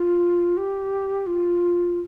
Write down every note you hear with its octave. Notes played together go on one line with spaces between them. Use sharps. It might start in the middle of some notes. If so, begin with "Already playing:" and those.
Already playing: F4
G4
F4